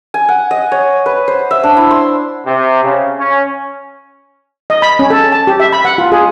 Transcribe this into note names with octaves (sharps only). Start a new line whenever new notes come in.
G#5
F#5
D#5
C#5
B4
C5
E5
D4
E4
C6
C3
C#3
C#4
D#5
B5
C#4
A4
A5
G4
E5
B5
F#5
F4
G#4